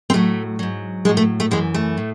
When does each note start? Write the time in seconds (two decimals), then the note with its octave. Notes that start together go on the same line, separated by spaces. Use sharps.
0.10 C4
0.13 A2 F#3 A3
0.59 G#2 F#3
1.05 A2 F#3 G#3
1.17 A3
1.40 A3
1.51 F#2 E3 G#3
1.74 A3
1.97 A2